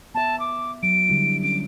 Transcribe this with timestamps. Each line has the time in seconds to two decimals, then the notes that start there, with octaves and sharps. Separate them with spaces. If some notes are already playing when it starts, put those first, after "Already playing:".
0.15 B3 E5 A5
0.40 D6
0.83 F#3 D7
1.09 D3 G3 E4
1.43 C#4 D7